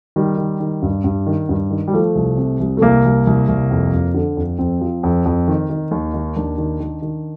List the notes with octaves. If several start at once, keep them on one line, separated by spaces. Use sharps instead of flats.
D#3 G3
D#3
D#3
G2
G2
D#3
G2
D#3
G3
F3 A3
C2
C3
C2
A3
C2 A#3
C2
C2
C2
F2
F2
D3
F2
F2 C4
F3
F2
F2
D#3
D#3
D#2
D#3
D#2 D4
D#3
D#3
D#3